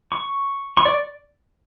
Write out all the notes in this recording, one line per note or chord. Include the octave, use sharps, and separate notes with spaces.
C#6
C#6
D5